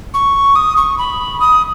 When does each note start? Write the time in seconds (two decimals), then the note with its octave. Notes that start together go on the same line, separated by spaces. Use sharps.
0.14 C#6
0.56 D#6
0.77 C#6
0.98 B5
1.40 D#6